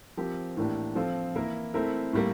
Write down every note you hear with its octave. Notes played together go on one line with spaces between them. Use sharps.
F3 C4 G4 A#4
A2 E3 A#3 D4 G4
F3 C4 F4 A4
E3 A#3 E4 A#4
A3 C4 E4 A#4
A2 G3 A#3